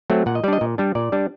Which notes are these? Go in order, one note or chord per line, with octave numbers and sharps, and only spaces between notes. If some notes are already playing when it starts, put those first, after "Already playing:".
F#3 A3 C4
A#2 F#5
D#5
G3 D4 D5 D#5
A#2
G3 D4
A#2 D5
G3 D4